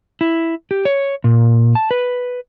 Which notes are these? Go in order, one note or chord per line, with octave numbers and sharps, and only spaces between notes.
E4
G4
C#5
A#2
A5
B4